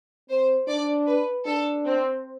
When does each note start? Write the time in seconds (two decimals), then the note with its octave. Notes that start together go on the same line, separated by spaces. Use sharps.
0.28 C4 C5
0.68 D4 D5
1.07 B4
1.46 D4 A4
1.86 C4